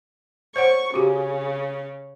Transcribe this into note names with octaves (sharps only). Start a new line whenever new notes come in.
C5 C#5 F#5 C#6
C#3 F#4 G4